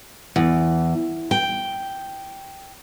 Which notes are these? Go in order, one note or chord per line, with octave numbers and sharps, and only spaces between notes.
E2
G5